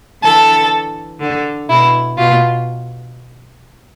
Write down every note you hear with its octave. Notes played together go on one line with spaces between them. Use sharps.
D3 E3 A4
D3
B2 E4
B2 F4